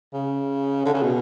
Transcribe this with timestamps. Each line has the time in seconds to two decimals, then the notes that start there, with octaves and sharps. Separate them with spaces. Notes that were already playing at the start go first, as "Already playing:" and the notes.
0.13 C#3
0.85 D3
0.94 C#3
1.03 B2